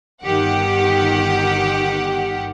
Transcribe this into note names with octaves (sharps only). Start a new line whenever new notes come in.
G1 D#3 G4 F#5